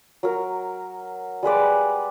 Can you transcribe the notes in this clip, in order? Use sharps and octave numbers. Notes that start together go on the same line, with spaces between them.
F#3 A#4
G3 G#3 B4 D5